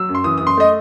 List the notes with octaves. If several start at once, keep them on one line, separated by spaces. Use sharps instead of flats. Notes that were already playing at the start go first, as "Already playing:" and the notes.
Already playing: F#3 E6
F#2
C6
E3 D#6
F#2 D#6
C6
A3 D#5